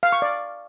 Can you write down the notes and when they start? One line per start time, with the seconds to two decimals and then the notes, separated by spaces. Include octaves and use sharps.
0.03 F5
0.12 C#6
0.22 D5